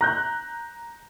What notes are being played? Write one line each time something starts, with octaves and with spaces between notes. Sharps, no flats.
A#5 F#6 G6